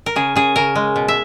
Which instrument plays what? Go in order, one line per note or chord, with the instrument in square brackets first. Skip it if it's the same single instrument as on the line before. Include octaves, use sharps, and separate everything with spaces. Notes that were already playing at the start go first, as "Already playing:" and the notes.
[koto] A#4
C#3 G#4
C#3 G#4
C#3 A#4
G#3
B2
E5